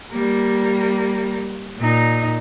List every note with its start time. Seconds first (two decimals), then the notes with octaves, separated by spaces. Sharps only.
0.12 G3 A#3
1.78 A#2 D#4